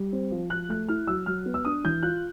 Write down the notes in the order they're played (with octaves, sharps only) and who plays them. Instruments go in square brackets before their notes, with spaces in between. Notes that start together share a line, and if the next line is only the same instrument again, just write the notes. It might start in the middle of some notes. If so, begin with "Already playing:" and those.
Already playing: [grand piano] G3
C4
F3
F3 F#6
A3 F#6
E4 F6
F#3 E6
F#3 F6
B3
E6
D4 D#6
E3 G6
F4 F#6